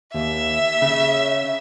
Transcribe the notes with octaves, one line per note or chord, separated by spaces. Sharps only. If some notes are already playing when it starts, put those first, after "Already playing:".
D#2 E5
C#3